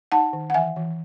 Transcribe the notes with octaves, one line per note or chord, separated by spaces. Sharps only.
D#4 F#5 A5
D#3
F#5
E3 E5 G#5
E3